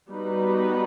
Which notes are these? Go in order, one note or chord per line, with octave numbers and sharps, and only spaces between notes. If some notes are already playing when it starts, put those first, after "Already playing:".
G3 B3 D#4 F#4 B4